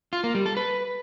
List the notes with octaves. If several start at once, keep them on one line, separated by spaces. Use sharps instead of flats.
F4
A#3
G3
A4
B4